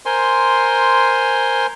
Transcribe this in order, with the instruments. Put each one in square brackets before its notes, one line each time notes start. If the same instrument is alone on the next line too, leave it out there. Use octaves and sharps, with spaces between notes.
[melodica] A#4 C5 G#5 C6